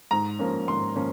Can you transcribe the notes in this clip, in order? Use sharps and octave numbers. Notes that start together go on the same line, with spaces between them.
G#2 A#5
F3 A#3 C#4
G#2 C6
F3 A#3 C#4